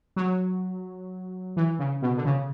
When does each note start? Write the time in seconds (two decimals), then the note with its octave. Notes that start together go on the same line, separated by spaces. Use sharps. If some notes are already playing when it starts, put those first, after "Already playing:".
0.16 F#3
1.57 E3
1.79 C#3
2.02 B2
2.17 D3
2.25 C#3